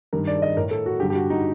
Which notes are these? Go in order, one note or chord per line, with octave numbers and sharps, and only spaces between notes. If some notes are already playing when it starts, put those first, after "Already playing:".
G2 D#3 A#4
D5
D5
D#5
A2 A#4
A4
F#4
G2 D3 G4
G4
F#4
D#4